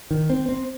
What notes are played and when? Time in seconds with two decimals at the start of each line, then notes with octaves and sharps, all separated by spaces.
0.11 D#3
0.30 C4
0.49 C4